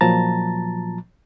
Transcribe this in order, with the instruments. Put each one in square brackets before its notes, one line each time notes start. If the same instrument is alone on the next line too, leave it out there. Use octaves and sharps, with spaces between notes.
[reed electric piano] A#2 F3 F#3 A5 A#5 A6